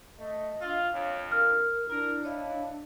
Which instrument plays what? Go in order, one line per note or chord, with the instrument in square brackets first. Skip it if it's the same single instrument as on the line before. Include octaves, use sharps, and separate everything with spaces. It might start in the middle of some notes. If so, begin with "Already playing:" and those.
[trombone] A3 [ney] D#5
[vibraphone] D4 F5 E6 [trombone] F4
[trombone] F2 [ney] C#5
[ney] A#4 [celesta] F6
[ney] D4 [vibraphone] E4 [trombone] A#4
[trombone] E4 [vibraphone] C#5 D#5 F5